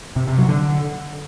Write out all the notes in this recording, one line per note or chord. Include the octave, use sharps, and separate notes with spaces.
C3
C3
F#3
D3